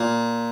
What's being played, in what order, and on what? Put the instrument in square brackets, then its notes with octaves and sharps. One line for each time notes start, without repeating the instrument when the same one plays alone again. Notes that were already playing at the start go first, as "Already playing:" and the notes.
Already playing: [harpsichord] A#2